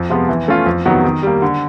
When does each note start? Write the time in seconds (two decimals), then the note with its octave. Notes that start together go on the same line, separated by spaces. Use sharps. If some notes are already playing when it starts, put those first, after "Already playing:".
Already playing: F2
0.09 C3 F3 G#3 B3
0.29 E3
0.48 A3 C#4 F4
0.66 F2
0.85 C3 D#3 F#3 B3
1.04 D#3
1.23 G3 A#3
1.42 D3